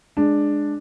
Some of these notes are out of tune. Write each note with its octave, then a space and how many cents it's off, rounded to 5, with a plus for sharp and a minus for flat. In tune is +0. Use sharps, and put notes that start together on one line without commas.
G#3 +0 D4 +5